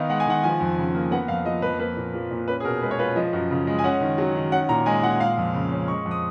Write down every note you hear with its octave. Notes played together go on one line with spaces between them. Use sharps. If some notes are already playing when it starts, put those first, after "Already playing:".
Already playing: D#3 B3 D#4 F5
G#3 F#5
G#5
D#3 F#5
F3 G#5
F2
C#3
A#3
B3 F#5
F2 F5
F3 D#5
F2 B4
A#3 B4
A#2
F3
A#2
C#4 B4
G#4
B2 A#4
G#3 B4
C#5
F4 B4
F3 D#5
F#2
C#3
G#3
G#5
C#4 F#5
D#3
F#3
D#3
C#4 F#5
A#2 A#5
G#3 G#5
A#2 F#5
G#3 F5
F2
C#3
C#4
G#3 C#6
F2
D#6